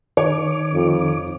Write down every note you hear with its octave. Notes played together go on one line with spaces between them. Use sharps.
D#3 C#5 D6
F2